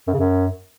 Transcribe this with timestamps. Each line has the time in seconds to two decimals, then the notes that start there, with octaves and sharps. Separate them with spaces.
0.08 F#2
0.13 C#3
0.19 F#2